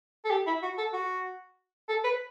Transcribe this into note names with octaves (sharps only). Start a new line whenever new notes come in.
A4
G4
E4
F#4
A4
F#4
A4
B4